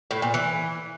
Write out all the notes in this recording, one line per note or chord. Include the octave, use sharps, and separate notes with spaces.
A2
A#2
E3